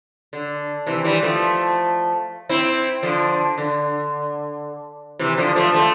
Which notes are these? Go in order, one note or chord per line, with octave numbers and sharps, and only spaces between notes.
D3
C3 E3
E3 G3
F3 A3
C4 E4
D3 F3
D3
C3 E3
D3 F3
F3 A3
F3 A3